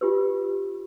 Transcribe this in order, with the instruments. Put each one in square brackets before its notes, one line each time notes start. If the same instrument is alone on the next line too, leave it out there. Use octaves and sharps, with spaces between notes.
[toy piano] F4 G4 B4